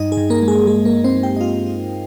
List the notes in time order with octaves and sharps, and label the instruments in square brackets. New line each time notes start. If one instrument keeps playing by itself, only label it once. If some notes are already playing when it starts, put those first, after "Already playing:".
Already playing: [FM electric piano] G2 D#4 D#5
G#4
G2
A#3 A#4
G#3
G#4
G#3 G#4
A#3 A#4
G#3
C4 C5
G#3
G4 G5
D#5
D#4 F4 F5
D#4